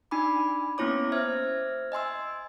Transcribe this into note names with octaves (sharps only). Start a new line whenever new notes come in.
D4 D#4 G#5 B5 D6
A#3 B3 C#4 E4 C#5 D6
C5 E5 F6 G#6
D#5 G#5 C6 E6